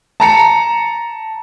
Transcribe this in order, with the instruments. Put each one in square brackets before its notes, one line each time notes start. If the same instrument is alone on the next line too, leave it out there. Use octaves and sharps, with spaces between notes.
[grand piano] A5 A#5 C#7